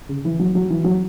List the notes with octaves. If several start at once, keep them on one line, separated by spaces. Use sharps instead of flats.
C#3
E3
F#3
F#3
E3
F#3